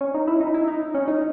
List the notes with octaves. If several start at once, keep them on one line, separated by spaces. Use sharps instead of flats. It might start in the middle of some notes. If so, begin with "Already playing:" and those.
C#4
D#4
E4
D#4
E4
D#4
C#4
D#4